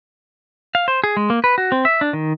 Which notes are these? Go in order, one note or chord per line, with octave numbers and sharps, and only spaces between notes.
F5
C5
G#4
G#3
A#3
B4
F#4
C4
E5
D4
D#3